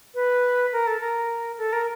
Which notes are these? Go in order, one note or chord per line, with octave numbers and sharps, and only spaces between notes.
B4
A#4
A4
A#4
A4
A#4